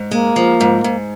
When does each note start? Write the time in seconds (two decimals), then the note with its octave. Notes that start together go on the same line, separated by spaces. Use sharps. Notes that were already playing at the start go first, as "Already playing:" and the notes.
Already playing: G#2
0.11 G#3 A#3
0.36 F3
0.61 G#2
0.84 G#2